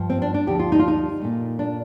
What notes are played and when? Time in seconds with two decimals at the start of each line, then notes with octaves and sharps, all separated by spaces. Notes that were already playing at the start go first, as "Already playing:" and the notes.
Already playing: G2 F3
0.10 C4
0.22 D4
0.34 D4
0.47 D2 D3 F3 G4
0.59 F4
0.72 D#4
0.79 F4
0.88 D#4
1.22 A#2 A3
1.59 D4